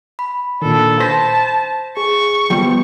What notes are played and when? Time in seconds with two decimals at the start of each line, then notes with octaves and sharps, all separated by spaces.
0.19 B5
0.62 A#2 D#3 D4 A4
1.00 C5 A5 G6 A#6 B6
1.97 G#4 C#6
2.50 F3 G3 B3 G5